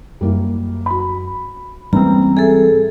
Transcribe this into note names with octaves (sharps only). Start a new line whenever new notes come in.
F#2 G3 A#3 E4
F#4 B5
G#2 E3 G3 A#3 C4 C#4 A#5
G#4 A4 E5 G#5